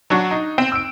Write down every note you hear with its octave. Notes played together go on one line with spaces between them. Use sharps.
F#3 D4 F#4
D#4
C4
E6 D7